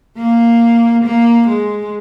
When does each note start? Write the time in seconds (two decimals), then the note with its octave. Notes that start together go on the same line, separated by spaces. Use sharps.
0.18 A#3
1.05 A#3
1.49 G#3